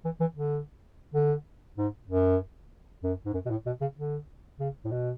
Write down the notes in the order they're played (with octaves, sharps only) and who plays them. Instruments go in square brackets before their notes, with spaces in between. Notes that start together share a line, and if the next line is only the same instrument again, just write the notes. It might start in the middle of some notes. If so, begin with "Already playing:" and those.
[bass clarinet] E3
E3
D3
D3
G#2
F#2
F#2
G#2
F#2
B2
A2
B2
C#3
D3
C#3
A2
B2